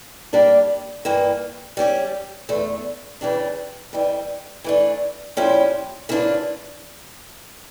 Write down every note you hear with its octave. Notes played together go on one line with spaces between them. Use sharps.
G3 A#3 D4 G4
G2 E3 A#3
G3 C#4 G4
E2 D3 A3
C#3 E3 G3 D4
F2 E3 G3
E3 A3 D4
A#2 F3 C#4 E4 G4
C#3 E3 A#3 D4 F4